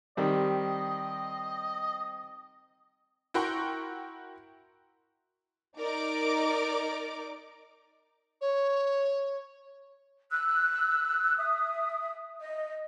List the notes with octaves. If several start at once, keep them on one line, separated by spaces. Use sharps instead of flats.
D#3 G3 C4 D#5
E4 F#4 A#4 G5 C6 C#6
D#4 A#4 D5 D6
C#5
E6 F#6
E5 D#6
D#5